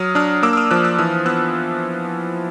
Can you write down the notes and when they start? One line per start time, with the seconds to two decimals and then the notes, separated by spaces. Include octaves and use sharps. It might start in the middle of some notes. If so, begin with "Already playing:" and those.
Already playing: F#3 D#6 F6
0.15 D4 D#6 F6
0.43 A#3 D6 E6
0.53 E6
0.57 D#6 F6
0.71 F3 E6 F#6
0.84 E6 F#6
0.98 E3 D#6 F6
1.26 B3 E6 F#6